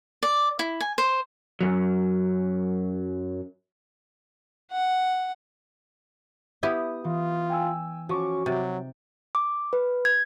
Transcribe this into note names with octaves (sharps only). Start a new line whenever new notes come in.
D5
E4
G#5
C5
F#2 F#3
F#5
B3 E4 G4 D#6
E3 F4
G5 G#5 E6
F3 C#4 F#4 C#6 D6
C3 F#3 D#4 G5 A6
D6
B4
G#6